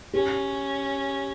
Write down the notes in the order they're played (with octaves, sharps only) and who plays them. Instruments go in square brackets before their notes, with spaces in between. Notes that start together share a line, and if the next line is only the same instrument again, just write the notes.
[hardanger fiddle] C#4 [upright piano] G4